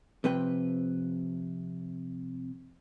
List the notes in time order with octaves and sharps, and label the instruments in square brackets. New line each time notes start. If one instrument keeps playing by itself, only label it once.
[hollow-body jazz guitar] C3 F3 B4 G5